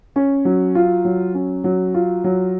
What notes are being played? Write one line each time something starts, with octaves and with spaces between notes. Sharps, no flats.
C#4
F#3
F4
F#3
C#4
F#3
F4
F#3